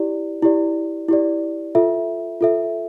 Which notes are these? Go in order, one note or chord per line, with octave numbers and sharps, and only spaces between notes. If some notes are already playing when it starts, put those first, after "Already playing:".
Already playing: E4 G4 D5
E4 G4 D5
E4 G4 D5
F4 A4 E5
F4 A4 E5